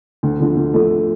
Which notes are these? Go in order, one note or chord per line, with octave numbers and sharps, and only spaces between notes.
D2
D3 F3 A3
D2
D3 F3 A3